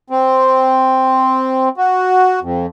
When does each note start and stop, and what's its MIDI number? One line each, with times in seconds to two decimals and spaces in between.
0.10 1.69 60
1.77 2.40 66
2.42 2.66 41